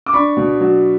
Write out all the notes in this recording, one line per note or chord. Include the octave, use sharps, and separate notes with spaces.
D6
D4 B5 C#6
B2
F#3